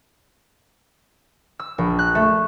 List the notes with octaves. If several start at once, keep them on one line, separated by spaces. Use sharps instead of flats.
E6
A#1
F#6
A3